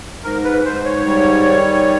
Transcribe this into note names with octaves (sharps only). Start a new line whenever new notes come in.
G#2 A#4
B4
G#2 C5
C#5
G3
D#3